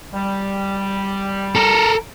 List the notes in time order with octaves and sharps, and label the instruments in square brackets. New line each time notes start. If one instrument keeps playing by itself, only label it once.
[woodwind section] G3
[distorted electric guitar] A4 A#4